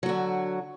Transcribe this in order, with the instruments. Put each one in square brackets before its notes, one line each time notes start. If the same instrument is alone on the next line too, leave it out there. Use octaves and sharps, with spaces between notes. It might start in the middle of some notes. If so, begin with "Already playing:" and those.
[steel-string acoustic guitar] F#3
F#4
D3